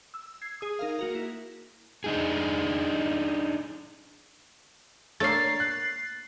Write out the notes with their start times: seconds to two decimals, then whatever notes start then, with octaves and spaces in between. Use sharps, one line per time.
0.14 E6
0.42 G#6 C7
0.61 G#4 D#6
0.79 D#4 A#4 F5
0.99 A#3 F#4 A#4
1.15 E4
2.04 D4 D#4 G#4
5.20 A3 A#3 D4 A#4 C#5 A6 C7
5.60 F#6